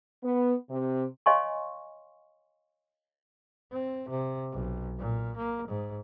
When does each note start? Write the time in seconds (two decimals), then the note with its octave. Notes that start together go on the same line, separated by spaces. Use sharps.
0.23 B3
0.69 C3
1.26 C#5 D#5 F5 G#5 C6 C#6
3.71 C4
4.09 C3
4.52 B1
4.98 A#2
5.37 A#3
5.68 G#2